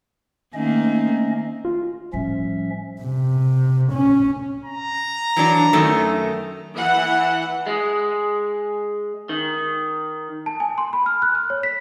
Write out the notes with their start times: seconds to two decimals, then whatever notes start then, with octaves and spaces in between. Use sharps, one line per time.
0.54 D#3 A3 A#3 C4 C#4 D#5
1.65 F4
2.13 A2 F3 G3 C#4 E5
3.02 C3
3.93 C#4
4.65 A#5
5.36 E3 F#3 D4
5.73 F#2 D#3 A3
6.77 E3 F#5
7.67 G#3
9.29 D#3
10.46 A5
10.60 G#5
10.78 C6
10.93 B5
11.06 F6
11.22 F#6
11.35 F6
11.50 C#5
11.63 B6